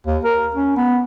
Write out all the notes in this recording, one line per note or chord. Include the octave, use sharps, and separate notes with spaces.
D#2
A#4
C#4
B3